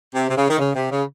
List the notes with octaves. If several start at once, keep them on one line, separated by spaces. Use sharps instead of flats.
C3
C3
C#3
D#3
C#3
C3
C#3